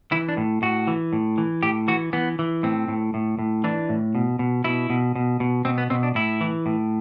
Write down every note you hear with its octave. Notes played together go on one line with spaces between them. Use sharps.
E3 E4
D4
A2
A2 F#4
E3
A2
E3
A2 G4
E3 F#4
E3 B3
E3
A2 C4
A2
A2
A2
E3 D4
A2
B2
B2
B2 E4
B2
B2
B2
B2 C4
B3
B2 C4
D4
A2 E4
E3
A2